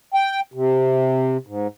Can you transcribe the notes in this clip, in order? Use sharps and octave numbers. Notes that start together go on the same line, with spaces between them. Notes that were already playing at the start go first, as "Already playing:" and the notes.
G5
C3
G#2